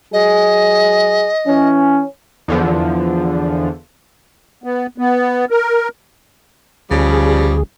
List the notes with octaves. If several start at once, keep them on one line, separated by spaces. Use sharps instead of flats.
F#3 G#4 D#5
E3 C#4
E2 D3 F3
B3
B3
A#4
D2 C#3 F3 G3 G#4